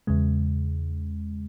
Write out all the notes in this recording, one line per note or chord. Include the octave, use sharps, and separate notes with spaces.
E2 C#3 G#3